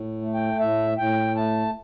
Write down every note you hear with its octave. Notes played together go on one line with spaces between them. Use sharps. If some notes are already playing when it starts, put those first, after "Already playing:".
Already playing: A2
A3
G5
A2 E5
A2 G5
A3 A5